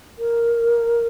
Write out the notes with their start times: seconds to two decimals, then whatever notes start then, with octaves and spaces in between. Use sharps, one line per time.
0.19 A#4